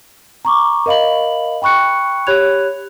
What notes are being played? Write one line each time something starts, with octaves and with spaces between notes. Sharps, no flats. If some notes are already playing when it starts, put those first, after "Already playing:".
A#5 C#6 D6
A#4 D#5 F5 B5 F#7
G5 B5 C#6 F#6 C#7
G4 C#5 B5 F#6 G#6 F7